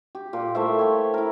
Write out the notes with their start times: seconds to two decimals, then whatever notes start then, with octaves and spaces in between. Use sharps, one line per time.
0.15 G4
0.33 A#2
0.55 A3 E4 C5 E5
0.79 C#5 G5
1.14 E4 A#4